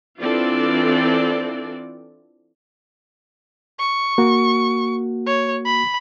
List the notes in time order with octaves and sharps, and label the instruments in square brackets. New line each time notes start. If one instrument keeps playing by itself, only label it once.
[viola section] E3 C4 D4 F4 A4 D5
[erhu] C#6
[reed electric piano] A#3 F#4
[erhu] C#5
B5